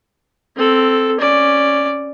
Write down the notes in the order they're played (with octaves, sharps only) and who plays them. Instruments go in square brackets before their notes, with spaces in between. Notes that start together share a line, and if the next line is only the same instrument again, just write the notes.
[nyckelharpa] C4 A4
C#4 D5